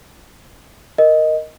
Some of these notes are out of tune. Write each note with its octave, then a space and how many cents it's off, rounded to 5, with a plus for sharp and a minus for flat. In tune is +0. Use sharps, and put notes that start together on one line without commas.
A#4 +0 D#5 +0